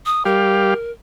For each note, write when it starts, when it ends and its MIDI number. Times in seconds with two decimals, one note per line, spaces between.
0.06 0.25 87
0.25 0.74 55
0.25 0.74 67
0.25 0.91 70
0.25 0.74 77